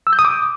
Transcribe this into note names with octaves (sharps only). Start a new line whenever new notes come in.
E6
G6
D#6
D6